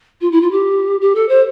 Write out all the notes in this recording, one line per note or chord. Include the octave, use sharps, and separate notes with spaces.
F4
E4
F4
G4
G4
A4
C5